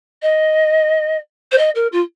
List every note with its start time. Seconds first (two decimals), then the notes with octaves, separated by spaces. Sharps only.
0.22 D#5
1.52 C5
1.58 D#5
1.75 A#4
1.92 F4